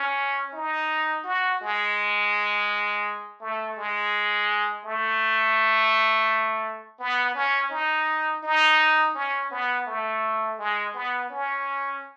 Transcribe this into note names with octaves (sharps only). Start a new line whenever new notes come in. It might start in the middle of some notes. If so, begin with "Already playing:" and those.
Already playing: C#4
D#4
F#4
G#3
A3
G#3
A3
B3
C#4
D#4
D#4
C#4
B3
A3
G#3
B3
C#4